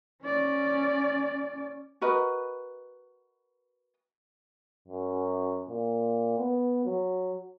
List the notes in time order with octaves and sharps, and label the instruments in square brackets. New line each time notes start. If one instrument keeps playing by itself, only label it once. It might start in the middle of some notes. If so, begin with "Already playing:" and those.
[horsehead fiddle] C#4 D5
[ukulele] F#4 A#4 B4 D#5
[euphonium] F#2
A#2
B3
F#3